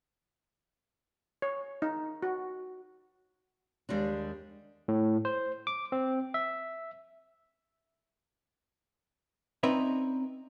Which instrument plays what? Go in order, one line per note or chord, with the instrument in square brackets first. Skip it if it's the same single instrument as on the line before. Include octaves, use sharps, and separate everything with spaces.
[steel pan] C#5
D#4
F#4
[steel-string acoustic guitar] D#2 G3 G#3 D4
[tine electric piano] A2
C5
D6
C4
E5
[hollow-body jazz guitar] C4 C#4 D#4 B4 D5 E5